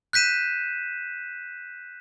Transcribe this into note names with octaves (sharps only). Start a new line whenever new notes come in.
F#6 G6 B6 D#7 E7